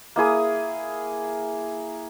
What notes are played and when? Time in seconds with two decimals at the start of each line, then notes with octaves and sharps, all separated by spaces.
0.16 A#3 E4 G#4 D#6